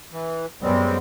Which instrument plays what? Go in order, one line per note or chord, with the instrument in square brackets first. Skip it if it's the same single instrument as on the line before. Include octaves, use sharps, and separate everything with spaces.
[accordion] E3
[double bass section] F#2 B3 [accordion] G3 G#3 C4